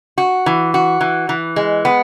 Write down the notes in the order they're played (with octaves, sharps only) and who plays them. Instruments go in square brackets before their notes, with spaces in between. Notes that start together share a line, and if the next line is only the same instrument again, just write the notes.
[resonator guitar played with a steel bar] F#4
E3
F#4
E3
E3
G#3
B3